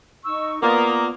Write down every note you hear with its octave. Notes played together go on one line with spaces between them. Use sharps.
D#4 C#6 E6
A#3 B3 F4 B4 D5 A#5 D#6